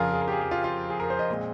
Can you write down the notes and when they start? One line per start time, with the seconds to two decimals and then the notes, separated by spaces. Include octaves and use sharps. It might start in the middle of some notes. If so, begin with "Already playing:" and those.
Already playing: F2 C#3 F3 F4 G#4 A#4
0.13 G#4
0.22 A#4
0.28 G4
0.32 G#4
0.41 G4
0.51 F4
0.64 F4
0.90 G#4
1.00 A#4
1.10 C5
1.19 D#5
1.30 A#2 G#3 C4